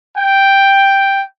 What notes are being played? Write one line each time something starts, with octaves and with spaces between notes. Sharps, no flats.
G5